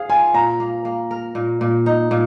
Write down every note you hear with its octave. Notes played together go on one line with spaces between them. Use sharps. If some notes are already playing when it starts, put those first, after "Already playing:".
Already playing: G#4 F5
F4 G#5
A#2 A#5
A#3
A#3
A#4
A#2
A#2
D#4
A#2